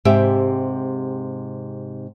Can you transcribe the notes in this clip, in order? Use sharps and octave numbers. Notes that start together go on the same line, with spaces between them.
G#2 C3 G4 E5 G5